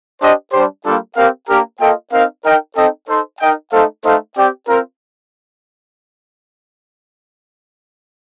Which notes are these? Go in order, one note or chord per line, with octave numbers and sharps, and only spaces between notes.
D4 G4 C5 D#5
G3 D4 G4 C5
G3 A#3 D4 F4 A4
C4 G4 A#4 F5
A#3 D4 G4 A#4
A#3 F4 A4 D#5 G5
C4 D#4 A#4 F5
D#4 A#4 D#5 G5
C4 D#4 A4 D#5 G5
D#4 A4 C5
D#4 A#4 D#5 G5
A3 D#4 A4 C5 F5
A3 D#4 A4 C5 F5
C4 G4 D5 G5
C4 F4 A#4